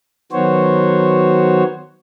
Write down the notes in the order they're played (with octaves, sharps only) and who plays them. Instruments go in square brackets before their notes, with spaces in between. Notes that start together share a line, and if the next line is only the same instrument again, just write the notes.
[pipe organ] D#3 F#3 B3 F#4 C5 C#5